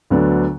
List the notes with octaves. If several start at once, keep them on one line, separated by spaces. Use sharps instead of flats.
D2 D3 F#3 B3 D4